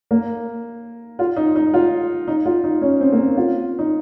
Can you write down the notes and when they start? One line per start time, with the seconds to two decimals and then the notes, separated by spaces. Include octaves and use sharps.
0.11 A#3
1.19 F4
1.36 D#4
1.56 D#4
1.74 F4
2.28 D#4
2.46 F4
2.64 D#4
2.81 C#4
3.01 C4
3.12 A#3
3.18 C4
3.37 F4
3.79 D#4